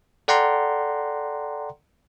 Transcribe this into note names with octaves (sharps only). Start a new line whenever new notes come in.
A4 D5 F#5 G5 A#5 C6